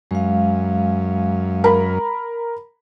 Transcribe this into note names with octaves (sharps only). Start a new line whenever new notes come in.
F#2 G#3 F5
A#4 B5